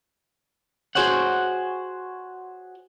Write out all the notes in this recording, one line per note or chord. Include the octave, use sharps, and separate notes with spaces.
F#4 G#4 C5 C#5 F#5